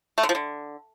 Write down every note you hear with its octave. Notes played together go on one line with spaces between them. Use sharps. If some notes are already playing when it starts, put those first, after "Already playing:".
A3
D3
F3
D3